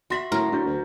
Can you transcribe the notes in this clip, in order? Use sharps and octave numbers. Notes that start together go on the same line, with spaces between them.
F#4 E5 B5 C6 A#6 B6
A2 F#3 C#4 A#4
A2 D4 F#4 G6
D2